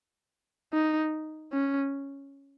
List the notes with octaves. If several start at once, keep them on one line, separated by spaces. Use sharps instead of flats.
D#4
C#4